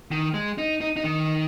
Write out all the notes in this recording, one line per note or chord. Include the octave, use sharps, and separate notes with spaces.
D#3
G#3
D#4
D#4
D#4
D#3